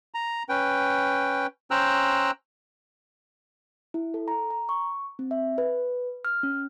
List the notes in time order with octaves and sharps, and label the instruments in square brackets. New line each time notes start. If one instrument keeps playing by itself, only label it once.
[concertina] A#5
C#4 B4 G5
C#4 C5 G5 A#5 E6 F#6
[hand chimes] E4
A4
A#5
A#5
C#6
C4
E5
B4
F6
C#4